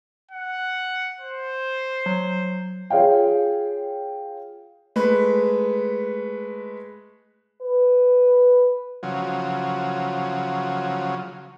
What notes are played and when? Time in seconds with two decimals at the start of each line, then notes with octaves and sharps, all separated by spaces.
0.31 F#5
1.21 C5
2.06 F#3
2.90 F4 G#4 C#5 F5 G5
4.96 G#3 A3 B4
7.62 B4
9.03 C#3 F3 F#3